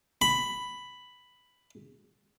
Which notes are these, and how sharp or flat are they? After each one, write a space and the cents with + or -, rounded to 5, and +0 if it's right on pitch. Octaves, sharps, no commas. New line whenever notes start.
B5 +5